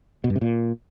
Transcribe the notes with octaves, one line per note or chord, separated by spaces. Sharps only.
B2
G2
C3
A#2